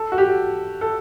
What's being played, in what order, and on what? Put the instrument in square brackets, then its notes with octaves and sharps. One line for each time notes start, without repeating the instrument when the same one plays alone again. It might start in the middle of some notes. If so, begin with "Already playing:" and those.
Already playing: [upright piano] A4
F#4
G4
A4